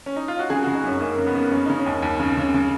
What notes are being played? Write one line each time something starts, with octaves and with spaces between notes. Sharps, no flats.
C#4
D#4
F4
F#4
C#3 G#4
F#4
C#3
D#4
F#2 C#4
F#2 A#3
C#3
B3
C#3
C#3 C#4
C#3 D#4
C#4
D#2
D#2
C#3
C#3
C#3